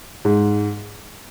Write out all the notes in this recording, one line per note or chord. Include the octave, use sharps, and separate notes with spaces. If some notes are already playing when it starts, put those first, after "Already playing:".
G#2